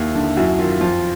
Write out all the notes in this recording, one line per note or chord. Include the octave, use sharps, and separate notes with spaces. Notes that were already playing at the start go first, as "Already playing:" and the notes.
Already playing: D#2 E4
D3
F#2 E4 F#4
D#3 F4
F2 F4